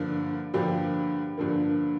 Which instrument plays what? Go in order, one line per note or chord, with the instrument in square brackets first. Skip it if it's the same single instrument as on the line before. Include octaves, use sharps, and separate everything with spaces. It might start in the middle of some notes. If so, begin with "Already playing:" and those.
Already playing: [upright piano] G2 D3 F3 A#3
G2 D3 F3 A#3 G4
G2 D3 F3 A#3